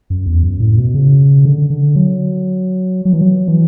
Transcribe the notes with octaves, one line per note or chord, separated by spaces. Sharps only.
F#2
E2
F#2
A2
B2
C#3
D3
D3
F#3
F#3
E3
F#3
E3